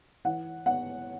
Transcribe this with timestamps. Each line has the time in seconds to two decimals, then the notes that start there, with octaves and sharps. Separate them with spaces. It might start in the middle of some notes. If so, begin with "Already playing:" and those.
0.25 E3 F#5
0.66 B3 F#5